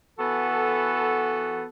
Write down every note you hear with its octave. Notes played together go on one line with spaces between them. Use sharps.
E3 B3 F#4 A4